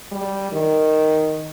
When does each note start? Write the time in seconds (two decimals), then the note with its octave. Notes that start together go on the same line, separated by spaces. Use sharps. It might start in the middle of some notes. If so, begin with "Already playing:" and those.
0.12 G3
0.52 D#3